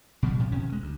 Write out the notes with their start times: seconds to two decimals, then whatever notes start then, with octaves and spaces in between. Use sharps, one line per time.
0.23 B2 F3 G3
0.39 A2 C3 F3
0.52 F2 B2 D#3 C#4
0.69 D2 G#3
0.82 D2